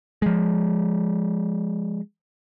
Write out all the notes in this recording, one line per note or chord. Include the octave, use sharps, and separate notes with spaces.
F3 G#3